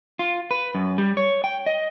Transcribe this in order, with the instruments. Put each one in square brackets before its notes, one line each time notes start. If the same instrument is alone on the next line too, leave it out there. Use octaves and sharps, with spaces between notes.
[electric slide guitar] F4
B4
F#2
G3
C#5
G5
D#5